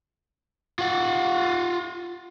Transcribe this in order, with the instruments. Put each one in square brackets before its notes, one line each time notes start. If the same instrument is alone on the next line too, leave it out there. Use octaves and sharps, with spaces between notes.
[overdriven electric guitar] F4 F#5